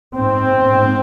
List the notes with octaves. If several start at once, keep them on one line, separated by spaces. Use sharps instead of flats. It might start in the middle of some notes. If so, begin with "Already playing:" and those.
G#2 C4
G#2